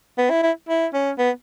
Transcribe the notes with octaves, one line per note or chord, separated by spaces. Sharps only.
B3
E4
E4
E4
C#4
B3